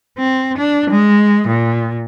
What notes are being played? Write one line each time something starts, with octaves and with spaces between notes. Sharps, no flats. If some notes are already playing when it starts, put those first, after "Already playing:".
C4
D4
G#3
A#2